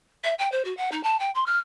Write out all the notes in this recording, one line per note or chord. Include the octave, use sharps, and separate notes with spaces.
E5
G5
C5
F#4
F#5
D#4
A5
G5
C6
F6